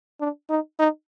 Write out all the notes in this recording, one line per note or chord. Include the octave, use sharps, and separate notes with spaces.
D4
D#4
D#4